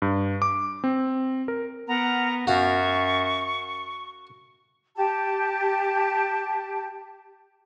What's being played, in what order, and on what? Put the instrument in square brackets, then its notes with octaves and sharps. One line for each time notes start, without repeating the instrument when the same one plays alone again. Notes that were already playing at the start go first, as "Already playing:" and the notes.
[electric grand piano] G2
D6
C4
A#4
[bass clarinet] B3 [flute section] A#4 F#5 A#5
[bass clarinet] F#2 [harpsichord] F#4 F5 [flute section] C#6
[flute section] G4 A5